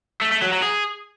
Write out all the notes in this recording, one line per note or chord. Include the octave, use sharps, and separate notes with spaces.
A3
A3
F#3
F#3
G#4